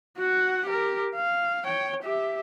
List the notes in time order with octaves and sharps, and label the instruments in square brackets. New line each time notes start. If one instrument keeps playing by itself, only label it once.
[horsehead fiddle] F#4 F#5
G4 A#4
F5
C#5 G5
G4 E5